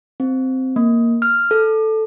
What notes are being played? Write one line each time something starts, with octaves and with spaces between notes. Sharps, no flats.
C4
A#3
F6
A4